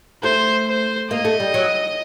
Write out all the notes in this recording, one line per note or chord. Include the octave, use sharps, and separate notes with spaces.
A3 C5
C5
A#3 D#5
A3
G3
F#3